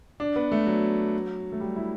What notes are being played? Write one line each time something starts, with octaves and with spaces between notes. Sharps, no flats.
D4
B3
A3
F#3
A3
G3
E4